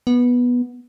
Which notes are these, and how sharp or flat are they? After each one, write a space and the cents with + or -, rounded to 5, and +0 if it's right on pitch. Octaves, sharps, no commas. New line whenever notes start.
B3 -10